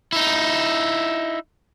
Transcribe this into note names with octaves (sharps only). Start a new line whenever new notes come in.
D#4 E4